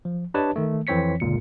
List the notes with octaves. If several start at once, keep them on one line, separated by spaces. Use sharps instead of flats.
F3
D4 G4 B4 C#5 D#5 A5
D#3 A3
F2 E3 C4 C#5 B6 C#7
G1 C#2 A#2 C#7